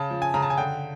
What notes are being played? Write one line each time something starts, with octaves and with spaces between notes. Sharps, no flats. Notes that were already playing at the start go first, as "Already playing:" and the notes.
Already playing: C#3 A5
F3
G#5
C#3 A#5
A5
G#5
D3 G5